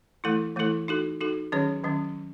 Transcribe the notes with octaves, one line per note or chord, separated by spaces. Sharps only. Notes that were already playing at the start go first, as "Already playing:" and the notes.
E3 A3 E4 A4
E3 A3 E4 A4
D#4 F#4 A4
D#4 F#4 A4
D#3 F#3 C#4 G#4 C#5
D#3 F#3 C#4